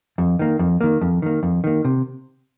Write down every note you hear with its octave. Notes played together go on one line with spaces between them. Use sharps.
F2
D#3 A#3
F2
D#3 A#3
F2
D#3 A#3
F2
D#3 A#3
C3